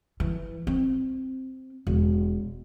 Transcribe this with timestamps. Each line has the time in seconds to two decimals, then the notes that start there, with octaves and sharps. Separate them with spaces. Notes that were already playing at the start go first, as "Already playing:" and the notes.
0.20 E3
0.67 C4
1.87 E1